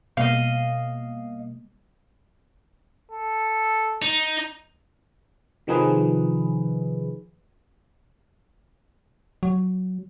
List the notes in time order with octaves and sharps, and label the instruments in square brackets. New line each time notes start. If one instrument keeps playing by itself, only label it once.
[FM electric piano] B2 G3 A#3 [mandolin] D#5 F5
[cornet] A4
[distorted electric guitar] D#4
[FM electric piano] C3 D#3 F3 D#4 G#4 B4
[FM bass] F#3